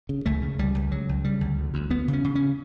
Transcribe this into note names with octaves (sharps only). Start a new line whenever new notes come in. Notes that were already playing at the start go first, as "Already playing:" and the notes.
C#3
C#2 A3
C#3
C#2 G3
C#2
C#3 F#3
C#2
C#3 G3
D2
D2
D2
D2 B3
C#3
C#4
C#3
C#4